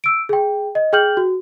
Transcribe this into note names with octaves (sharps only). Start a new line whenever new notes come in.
E6 D7
G#4 G5
D#5
G#4 G5 F6 G6 F#7
F#4